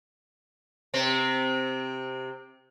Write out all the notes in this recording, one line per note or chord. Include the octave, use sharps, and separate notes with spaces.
C3 C4